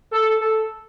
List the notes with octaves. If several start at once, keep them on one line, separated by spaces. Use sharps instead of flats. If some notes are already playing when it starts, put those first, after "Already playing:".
A4
A4